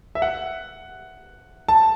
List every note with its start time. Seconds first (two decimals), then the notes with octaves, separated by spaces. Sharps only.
0.15 E5
0.22 F#5
1.68 A5